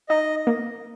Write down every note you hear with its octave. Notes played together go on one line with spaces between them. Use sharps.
D#4 D#5
A#3